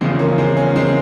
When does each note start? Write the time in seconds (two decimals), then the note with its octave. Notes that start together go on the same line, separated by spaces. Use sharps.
0.01 E2 C#3 F3 G#3 C4
0.19 A#3 C#4
0.38 G#3 C4
0.57 A#3 C#4
0.76 G#3 C4